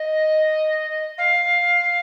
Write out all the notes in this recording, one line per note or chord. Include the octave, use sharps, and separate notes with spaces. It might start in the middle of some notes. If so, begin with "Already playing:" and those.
Already playing: D#5
F5